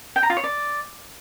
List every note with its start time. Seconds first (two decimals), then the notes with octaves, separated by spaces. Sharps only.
0.16 G5
0.23 A#5
0.30 F4
0.37 C#5
0.44 D5